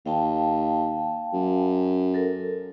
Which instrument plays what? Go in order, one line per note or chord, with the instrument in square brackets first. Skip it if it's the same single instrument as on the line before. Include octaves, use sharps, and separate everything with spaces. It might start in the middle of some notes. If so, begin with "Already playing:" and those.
[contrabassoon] D#2 [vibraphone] F5 G5 A5
[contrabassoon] F#2
[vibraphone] A4 A#4